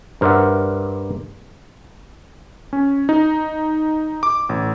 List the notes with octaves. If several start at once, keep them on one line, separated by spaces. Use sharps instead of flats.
G2 A#4 C5 D5 E5 F#5
C#4
D#4
D6
A1